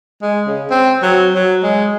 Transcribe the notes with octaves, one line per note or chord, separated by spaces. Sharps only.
G#3
C#3
C4
F#3
F#3
G#3